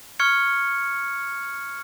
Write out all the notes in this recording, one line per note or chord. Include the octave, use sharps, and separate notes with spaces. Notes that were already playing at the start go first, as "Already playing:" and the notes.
C#6 F6 G#6 C#7